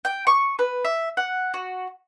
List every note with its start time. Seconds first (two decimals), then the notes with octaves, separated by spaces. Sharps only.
0.05 G5
0.27 C#6
0.59 B4
0.85 E5
1.17 F#5
1.54 F#4